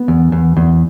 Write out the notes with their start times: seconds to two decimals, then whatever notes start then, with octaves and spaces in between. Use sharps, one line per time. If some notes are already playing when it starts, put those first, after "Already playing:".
Already playing: B3
0.08 E2
0.32 E2
0.57 E2